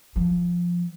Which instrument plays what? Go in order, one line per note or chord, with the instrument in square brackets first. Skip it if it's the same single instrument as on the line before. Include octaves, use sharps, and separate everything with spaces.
[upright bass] F3